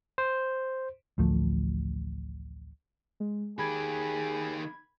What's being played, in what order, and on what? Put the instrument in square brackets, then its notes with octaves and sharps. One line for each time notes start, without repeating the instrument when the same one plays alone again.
[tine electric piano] C5
[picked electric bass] A1 D2 F3 A3
[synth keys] G#3
[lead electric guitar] D#3 G4 [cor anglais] G#4 [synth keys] B5 G#6